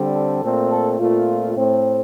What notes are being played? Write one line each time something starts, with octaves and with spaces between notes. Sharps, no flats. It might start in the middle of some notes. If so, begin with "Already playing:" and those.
Already playing: D3 G3 C4
A4
A#2 A3 C4
A4
A#2 A3 C4 F4
A2 A3 C4